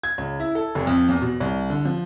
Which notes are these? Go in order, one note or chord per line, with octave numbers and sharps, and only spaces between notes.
G#6
C#2
E4
A4
F1
F2
E2
B2
C2
D3
F3